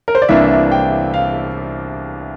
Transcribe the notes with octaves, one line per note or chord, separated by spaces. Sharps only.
A#4
C5
D5
C2 C3 E3 A#3 D4 E5
G5
F5